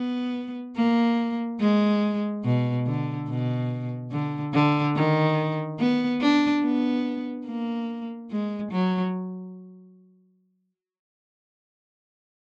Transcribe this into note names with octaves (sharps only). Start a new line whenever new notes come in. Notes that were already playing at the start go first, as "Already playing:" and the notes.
Already playing: B3
A#3
G#3
B2
D3
B2
D3
D3
D#3
B3
D4
B3
A#3
G#3
F#3